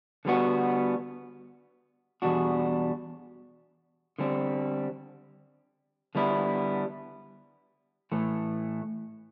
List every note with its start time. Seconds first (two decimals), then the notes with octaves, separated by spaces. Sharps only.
0.25 D3 G3 B3 F#4
2.22 E2 B2 G3 D4 F#4
4.19 D3 G3 C4
6.15 D3 G3 B3 E4
8.12 A2 E3 A3